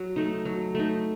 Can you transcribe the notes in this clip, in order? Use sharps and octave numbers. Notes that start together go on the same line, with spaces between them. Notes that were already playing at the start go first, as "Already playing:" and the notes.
Already playing: F#3
A3 D#4
F#3
A3 D#4